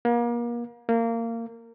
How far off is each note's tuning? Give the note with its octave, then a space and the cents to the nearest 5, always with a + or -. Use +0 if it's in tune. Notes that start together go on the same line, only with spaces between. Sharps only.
A#3 +35
A#3 -20